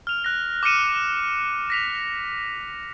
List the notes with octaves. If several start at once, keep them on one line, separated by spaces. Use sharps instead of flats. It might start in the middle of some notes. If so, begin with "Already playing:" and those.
F6 F7
F#6 A#6
D6 F6 F#6 C#7 D#7 E7
A#6 B6 F7